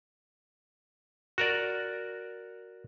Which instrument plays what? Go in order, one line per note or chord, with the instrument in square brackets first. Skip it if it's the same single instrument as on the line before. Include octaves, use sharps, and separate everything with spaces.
[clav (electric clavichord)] F#4 A#4 D5